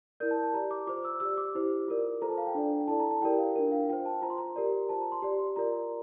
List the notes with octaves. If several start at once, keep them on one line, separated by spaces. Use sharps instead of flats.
E4 A#4 D5 G6
A5
A5
G4 D5 A#5
D6
F4 C5 D6
E6
G4 D5 E6
D6
E4 G4 C5
F4 A#4 D5
F4 A4 C5 A#5
A5
F5
G5
D4 A4 D5
G5
E4 A4 D5 A5
A#5
A5
E4 G4 A#4 D5 G5
F5
D4 F4 A#4 G5
F5
F4 C5 G5
A5
F4 C5 A#5
C6
A#5
G4 A#4 D5
F4 C5 A5
A#5
C6
G4 D5 C6
C6
F4 A#4 D5 A#5